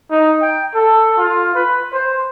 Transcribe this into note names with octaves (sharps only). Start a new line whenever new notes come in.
D#4
G5
A4
F4
B4
C5